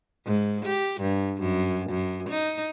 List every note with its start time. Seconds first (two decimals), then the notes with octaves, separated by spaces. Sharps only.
0.25 G#2
0.65 G4
1.01 G2
1.40 F#2
1.90 F#2
2.29 D#4